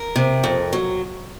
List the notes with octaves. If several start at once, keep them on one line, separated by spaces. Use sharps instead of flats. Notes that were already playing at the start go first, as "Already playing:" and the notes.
Already playing: A#4
C3
F2
F#3